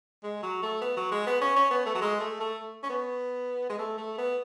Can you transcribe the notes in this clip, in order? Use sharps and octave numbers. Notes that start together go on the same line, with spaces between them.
G#3
F#3
A3
B3
F#3
G#3
B3
C#4
C#4
B3
A3
F#3
G#3
A3
A3
C#4
B3
G#3
A3
A3
B3